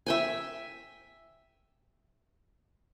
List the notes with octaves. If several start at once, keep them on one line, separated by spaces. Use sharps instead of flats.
E5 G5 G#5